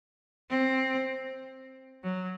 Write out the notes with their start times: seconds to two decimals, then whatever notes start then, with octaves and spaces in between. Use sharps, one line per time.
0.50 C4
2.03 F#3